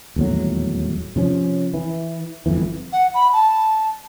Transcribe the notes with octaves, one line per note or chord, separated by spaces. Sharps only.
D#1 E2 A2 F#3
C3 F3 C#4
E3
G1 C2 F2 E3
F#5
B5
A5